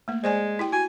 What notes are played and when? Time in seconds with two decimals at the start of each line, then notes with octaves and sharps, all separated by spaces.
0.08 A3 A#3
0.24 G#3 C5 D5 G#5
0.59 E4 G4 G5
0.72 F#4 G#5